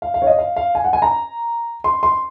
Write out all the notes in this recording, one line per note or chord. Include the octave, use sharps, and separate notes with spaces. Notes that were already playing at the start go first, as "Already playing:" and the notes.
F5
F5
C#5
D#5
F5
F5
G#5
F#5
G#5
A#5
C6
C6